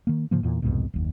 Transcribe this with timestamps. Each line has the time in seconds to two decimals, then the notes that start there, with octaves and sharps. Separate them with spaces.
0.07 D#3 A#3
0.31 G#2 C#3 F3 A#3
0.43 E2 A#2
0.62 C2 F2 G#2 B2
0.94 F#1 D#2